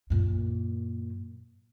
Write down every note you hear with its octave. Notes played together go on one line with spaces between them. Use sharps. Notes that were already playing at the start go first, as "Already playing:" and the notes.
F#2 A#2